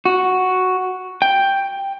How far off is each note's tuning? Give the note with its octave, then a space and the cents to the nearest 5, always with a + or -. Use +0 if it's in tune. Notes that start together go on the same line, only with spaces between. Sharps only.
F#4 +0
G5 +5